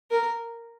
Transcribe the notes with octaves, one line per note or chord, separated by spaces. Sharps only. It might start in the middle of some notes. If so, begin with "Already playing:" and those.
A#4